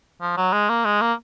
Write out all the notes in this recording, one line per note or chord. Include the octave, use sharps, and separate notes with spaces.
F3
F#3
G#3
A#3
G#3
A#3